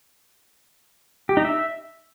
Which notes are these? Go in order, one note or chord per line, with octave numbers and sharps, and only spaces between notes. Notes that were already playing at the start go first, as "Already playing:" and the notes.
G4
D#4
E5